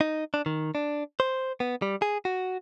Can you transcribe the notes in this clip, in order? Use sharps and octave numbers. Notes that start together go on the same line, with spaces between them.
D#4
D4
D#3
D4
C5
B3
G3
G#4
F#4